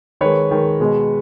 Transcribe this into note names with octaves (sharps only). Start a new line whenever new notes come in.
D#3 G#3 B4 C#5
D#3 G#3
B2 G#3